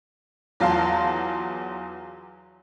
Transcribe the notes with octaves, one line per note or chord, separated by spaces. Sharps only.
E2 F#3 F4 F5 A5 C6